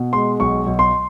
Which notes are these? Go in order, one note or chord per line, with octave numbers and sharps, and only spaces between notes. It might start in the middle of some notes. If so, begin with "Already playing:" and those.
Already playing: B2
G#3 C6
B1 C#6
B1
C6